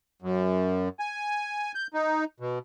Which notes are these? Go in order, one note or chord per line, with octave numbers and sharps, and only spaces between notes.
F#2
G#5
G6
D#4
B2